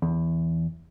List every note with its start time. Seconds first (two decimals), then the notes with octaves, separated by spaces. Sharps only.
0.02 E2